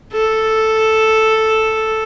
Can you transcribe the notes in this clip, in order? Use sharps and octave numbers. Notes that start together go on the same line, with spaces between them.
A4